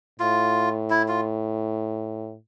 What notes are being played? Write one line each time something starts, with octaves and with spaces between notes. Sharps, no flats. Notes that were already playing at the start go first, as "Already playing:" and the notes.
A2 F4
E4
F4